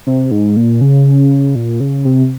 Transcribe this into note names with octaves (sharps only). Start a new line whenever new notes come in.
C3
G#2
A#2
C#3
A#2
C#3
C3